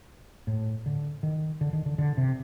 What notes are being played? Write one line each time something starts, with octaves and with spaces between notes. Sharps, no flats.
A2
D3
D#3
D3
D#3
D3
D3
C3